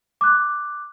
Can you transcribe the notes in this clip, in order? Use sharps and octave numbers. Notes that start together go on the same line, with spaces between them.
D6 F#6